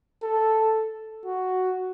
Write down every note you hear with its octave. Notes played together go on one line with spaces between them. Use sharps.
A4
F#4